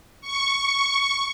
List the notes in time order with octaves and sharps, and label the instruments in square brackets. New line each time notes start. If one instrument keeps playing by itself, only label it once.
[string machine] C#6